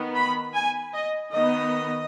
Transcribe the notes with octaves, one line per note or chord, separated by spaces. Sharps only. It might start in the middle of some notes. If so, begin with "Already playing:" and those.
Already playing: D#3 B3
B5
G#5
D#5
D#3 B3 D#5